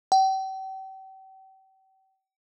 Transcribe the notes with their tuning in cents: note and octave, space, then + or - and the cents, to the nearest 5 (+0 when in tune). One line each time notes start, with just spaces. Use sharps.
G5 -40